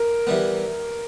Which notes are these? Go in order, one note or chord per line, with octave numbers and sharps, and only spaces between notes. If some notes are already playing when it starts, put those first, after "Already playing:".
Already playing: A#4
E3 G3 B3